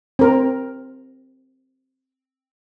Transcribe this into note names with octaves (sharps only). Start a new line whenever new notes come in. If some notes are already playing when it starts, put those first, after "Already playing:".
C4 A#4